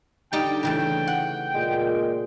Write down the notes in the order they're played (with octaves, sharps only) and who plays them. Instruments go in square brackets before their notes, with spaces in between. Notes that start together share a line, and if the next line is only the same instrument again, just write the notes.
[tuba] D3 [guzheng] G3 D#4 G4 [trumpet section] G5
[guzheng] C#3 E3 A3 [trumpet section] G5
[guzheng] F#5
[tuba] A#2 [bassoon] G#3